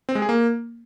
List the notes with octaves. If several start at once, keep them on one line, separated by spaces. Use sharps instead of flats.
C4
G#3
G#4
A#3